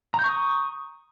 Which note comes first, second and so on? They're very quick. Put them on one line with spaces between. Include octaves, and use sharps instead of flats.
A#5 G6 C#6 D#6